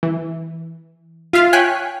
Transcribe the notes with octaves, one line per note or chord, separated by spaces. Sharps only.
E3
F4 E5 F5
C#5 G5 G#5 F#6 B6